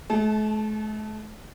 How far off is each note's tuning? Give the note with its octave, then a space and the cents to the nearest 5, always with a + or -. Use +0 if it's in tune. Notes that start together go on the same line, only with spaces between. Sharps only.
A3 -45 A5 -15